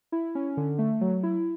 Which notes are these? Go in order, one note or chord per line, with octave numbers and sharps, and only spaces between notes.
E4
C#4
D3
A3
F#3
E4